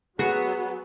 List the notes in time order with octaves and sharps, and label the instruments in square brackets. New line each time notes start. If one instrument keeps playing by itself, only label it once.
[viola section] F#3 [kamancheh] B3 [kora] F#4 [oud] G#4